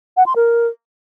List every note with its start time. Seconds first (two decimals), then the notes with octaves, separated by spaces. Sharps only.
0.17 F#5
0.26 C6
0.36 A#4